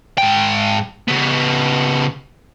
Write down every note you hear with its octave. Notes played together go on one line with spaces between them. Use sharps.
G#2 G5
C#3 B3